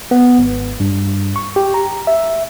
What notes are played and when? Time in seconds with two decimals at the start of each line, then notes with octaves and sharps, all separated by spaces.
0.11 B3
0.38 G#1
0.80 G2
1.36 C#6
1.56 G4
1.74 A#5
2.07 E5